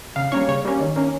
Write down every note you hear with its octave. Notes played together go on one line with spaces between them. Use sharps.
C#3 F5
G3 A#3 C#4 C#5
C#3 C#5
G3 A#3 C#4
D#3
A#3 C#4